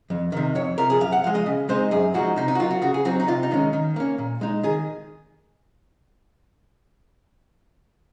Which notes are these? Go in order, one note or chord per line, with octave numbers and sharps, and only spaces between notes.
F2
C3 D#3
F2 C#5
C3 F3 A#4
G#4
F#2 F5
F#5
F3 G#3 F5
D#5
C#3
G#3 C4 D#4 C5
F#2 G#4
F3 G#3 C4 D#4 F#4
C3 D#4
D#4
F#4
F#3 A#3 F4
F#4
C#3 F#4
G#4
F#3 C4 D#4 F#4
D#4
C3 F4
D#4
D#3 G#3 C#4
D#3
A#3 C#4
A#2
G#3 D#4
D#3 G#4